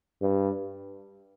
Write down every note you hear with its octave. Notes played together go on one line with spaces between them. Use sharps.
G2